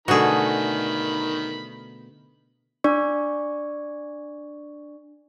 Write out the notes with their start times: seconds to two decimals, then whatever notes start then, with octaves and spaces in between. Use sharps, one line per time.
0.08 B2 D3 D#3 A3 F#4 G#4 B5
2.84 D4 D5 C#6